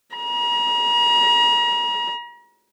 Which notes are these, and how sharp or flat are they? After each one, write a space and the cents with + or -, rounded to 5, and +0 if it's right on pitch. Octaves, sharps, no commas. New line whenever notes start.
A#5 +40